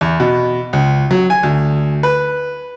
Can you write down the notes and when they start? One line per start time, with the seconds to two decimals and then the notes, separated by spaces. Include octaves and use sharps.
0.01 E2
0.20 B2
0.73 C#2
1.11 F#3
1.30 G#5
1.43 D2
2.03 B4